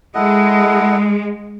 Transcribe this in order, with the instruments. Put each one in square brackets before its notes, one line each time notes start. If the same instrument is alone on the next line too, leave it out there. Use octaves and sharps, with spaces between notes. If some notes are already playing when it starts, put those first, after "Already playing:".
[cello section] G#3 [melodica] E4 A4 D#5 F#5